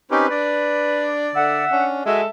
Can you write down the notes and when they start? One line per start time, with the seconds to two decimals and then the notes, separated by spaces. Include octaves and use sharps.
0.11 C4 C#4 D#4 G4 B4
0.30 D4 D5
1.35 D3 E5 F#5
1.71 C#4 D4
2.06 G#3 F#4 A4 E5 G#5